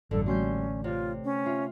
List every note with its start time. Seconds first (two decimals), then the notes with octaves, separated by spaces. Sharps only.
0.11 A1 E2 G2 B2 D3 A4
0.26 G3 A3 A#3 C#4 F#4 C6 G6
0.84 C3 F4 C#5 D5
1.24 C#4
1.46 F4 E5